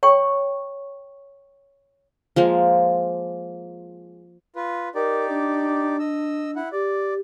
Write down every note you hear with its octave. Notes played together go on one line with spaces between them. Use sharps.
C#5 G5 C#6
F3 G#3 A#3
F4 B4
D#4 G4 A#4 D5
D4
D#5 E6
E4 F#5
G4 D5